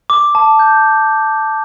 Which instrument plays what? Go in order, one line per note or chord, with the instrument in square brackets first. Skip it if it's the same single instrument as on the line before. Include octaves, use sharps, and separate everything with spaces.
[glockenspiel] D6
A5
G6